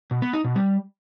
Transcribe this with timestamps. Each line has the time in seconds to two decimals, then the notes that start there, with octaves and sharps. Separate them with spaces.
0.11 B2
0.22 B3
0.33 D#4
0.45 B2
0.56 G3